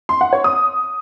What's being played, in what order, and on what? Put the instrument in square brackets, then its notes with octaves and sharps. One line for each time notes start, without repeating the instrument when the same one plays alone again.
[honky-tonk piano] C6
F#5
C#5
D#6